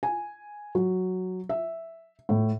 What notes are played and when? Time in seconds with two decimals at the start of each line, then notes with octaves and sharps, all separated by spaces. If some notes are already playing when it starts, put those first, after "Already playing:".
0.03 G#5
0.75 F#3
1.49 E5
2.29 A2